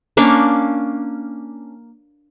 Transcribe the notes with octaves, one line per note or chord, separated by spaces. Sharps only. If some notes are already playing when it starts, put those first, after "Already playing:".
A#3 C#4 D4 F5